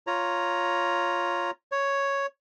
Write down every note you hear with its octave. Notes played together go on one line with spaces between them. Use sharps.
F4 C#5 A#5
C#5